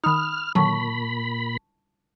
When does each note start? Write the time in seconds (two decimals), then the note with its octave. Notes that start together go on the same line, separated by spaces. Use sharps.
0.04 D#3 D#4 B5 D#6 F6
0.55 A#2 D3 D#3 F#3 A5 B5 C#6